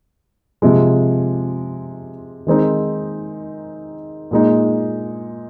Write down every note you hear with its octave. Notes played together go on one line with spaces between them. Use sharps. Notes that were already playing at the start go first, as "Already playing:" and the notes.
C3 F3 G#3
D#3 G#3 C4 D#4
A#2 G#3 D#4